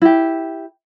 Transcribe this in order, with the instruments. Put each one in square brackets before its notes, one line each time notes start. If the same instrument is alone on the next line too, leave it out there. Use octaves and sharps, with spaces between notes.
[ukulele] E4 G4